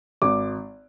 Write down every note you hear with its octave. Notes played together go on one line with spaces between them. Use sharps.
G#1 D6